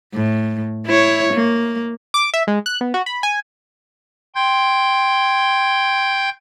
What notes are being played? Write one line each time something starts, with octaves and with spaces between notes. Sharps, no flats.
A2
E4 C#5
A#3
D6
E5
G#3
F#6
B3
F#4
B5
G#5
G5 C6 G6 G#6